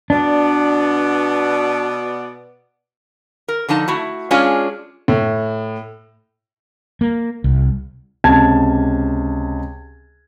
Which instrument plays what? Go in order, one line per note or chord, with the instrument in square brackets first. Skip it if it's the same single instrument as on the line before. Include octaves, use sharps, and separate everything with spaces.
[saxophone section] B2 B3 D5 [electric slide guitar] D4
[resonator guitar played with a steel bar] A#4
D3 F3 D#4 A5
A3 E4 F#4
G#3 C#4 D4 F4 G#4
[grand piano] A2
[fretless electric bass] A#3
C2
[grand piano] C#2 C3 A5 G#6